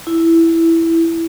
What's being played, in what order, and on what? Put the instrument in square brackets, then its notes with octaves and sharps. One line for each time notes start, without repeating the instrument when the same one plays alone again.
[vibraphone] E4